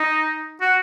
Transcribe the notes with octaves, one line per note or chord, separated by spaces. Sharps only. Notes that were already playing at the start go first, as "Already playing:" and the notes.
Already playing: D#4
F#4